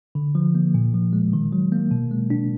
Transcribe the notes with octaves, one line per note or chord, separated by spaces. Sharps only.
D3
F3
A#3
A#2
F3
G#3
D#3
F#3
A#3
B2
G#3
D4